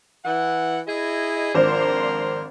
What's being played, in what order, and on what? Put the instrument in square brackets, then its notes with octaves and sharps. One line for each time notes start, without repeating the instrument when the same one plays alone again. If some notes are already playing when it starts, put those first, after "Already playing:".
[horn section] E3 F#5
E4 G#4 D#5
[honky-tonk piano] G#1 D4 C5 [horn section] F3 A#4 C6